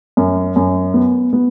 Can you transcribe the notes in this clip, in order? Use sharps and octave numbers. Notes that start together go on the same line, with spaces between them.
F#2
F#2
B3
B3